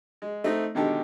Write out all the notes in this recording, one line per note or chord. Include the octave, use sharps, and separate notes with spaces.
G#3
A3 C4 D#4
B2 D3 D#3 G#3 G4 A4